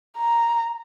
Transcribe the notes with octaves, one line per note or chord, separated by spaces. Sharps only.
A#5